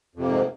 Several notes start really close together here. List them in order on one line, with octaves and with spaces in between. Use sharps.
F2 C3 A#3 G#2